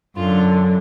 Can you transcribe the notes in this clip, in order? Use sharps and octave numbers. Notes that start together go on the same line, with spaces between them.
F#2 D3 F4